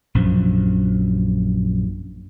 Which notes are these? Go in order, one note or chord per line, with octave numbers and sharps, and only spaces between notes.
A#1 F#2 F3